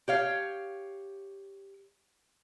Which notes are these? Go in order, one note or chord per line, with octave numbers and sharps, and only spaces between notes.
G4 C#5 F5